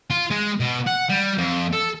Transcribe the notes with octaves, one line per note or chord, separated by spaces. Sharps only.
F4
G#3
B2
F#5
G3
F2
A4